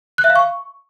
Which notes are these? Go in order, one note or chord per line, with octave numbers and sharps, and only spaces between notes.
F#6
E5
F5
C#6